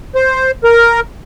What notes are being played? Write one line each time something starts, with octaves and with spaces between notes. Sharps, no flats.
C5
A#4